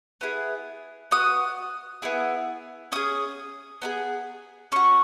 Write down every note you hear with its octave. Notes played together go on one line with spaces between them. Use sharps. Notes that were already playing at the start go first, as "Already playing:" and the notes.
B3 E4 G#4
B3 F#4 D#6
B3 E4 G#4
C#4 G#4 D#6
B3 D#4 G#4
C#4 F#4 C#6